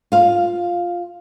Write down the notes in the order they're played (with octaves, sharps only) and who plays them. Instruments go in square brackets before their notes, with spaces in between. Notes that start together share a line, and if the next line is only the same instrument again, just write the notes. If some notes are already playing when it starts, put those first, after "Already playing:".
[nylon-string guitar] F4 F5